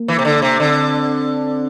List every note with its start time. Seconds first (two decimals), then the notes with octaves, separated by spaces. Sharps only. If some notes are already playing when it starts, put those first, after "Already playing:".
Already playing: A#3
0.08 E3
0.19 C3
0.25 D3
0.42 C3
0.60 D3 C4